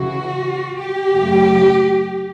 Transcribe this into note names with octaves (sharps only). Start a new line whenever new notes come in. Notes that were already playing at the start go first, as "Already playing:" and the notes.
Already playing: C#3 E3 F#4
G4
F#2 C#3 F#3 A3